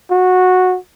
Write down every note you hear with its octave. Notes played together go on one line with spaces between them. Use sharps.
F#4